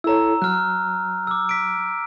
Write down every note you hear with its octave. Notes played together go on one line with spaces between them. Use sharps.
E4 A4 C#5 A#5 E6
F#3 F6 F#6
D6 E6
B6 D7